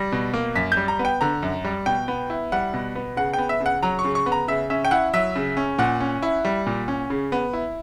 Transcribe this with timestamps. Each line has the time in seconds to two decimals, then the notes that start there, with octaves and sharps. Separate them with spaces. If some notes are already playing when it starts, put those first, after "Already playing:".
Already playing: G3 A#6
0.12 B2
0.34 A#3
0.55 F#2 B6
0.72 G6
0.77 G3
0.88 A#5
0.99 B3
1.05 G5
1.21 D3 A#5
1.43 F#2
1.64 G3
1.86 B2 G5
2.08 B3
2.30 E4
2.52 G3 F#5
2.74 B2
2.95 B3
3.17 C#3 F#5
3.33 B3 G5
3.49 E5
3.60 C#3
3.66 F#5
3.83 F#3 A#5
3.99 C#6
4.04 C#3
4.15 C#6
4.26 B3
4.32 A#5
4.48 C#3 E5
4.70 C#4 E5
4.85 G5
4.91 E4 F#5
5.13 F#3 E5
5.35 C#3
5.57 C#4
5.78 A#2 F#5
6.00 C#4
6.23 E4
6.45 G3
6.66 A#2
6.88 C#4
7.10 C#3
7.32 B3
7.53 E4